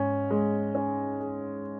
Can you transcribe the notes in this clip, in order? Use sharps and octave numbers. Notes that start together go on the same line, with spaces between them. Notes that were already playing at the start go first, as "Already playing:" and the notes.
Already playing: G#2 C#4
G#3
C#4
G#4